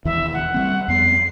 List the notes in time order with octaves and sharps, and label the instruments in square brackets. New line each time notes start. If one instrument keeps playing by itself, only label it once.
[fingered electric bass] E1 D#2 E3 [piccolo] E5
[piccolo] F#5
[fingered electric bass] G3 G#3 C4
[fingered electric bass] F2 B3 [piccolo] C7